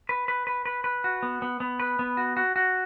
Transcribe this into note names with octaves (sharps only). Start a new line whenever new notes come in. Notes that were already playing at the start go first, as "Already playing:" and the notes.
B4
B4
B4
B4
B4
F#4
B3
B3
B3
B4
B3
F#4
F#4
F#4